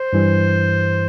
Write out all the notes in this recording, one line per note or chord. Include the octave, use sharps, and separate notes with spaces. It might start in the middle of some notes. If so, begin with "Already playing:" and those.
Already playing: C5
G2 E3 G3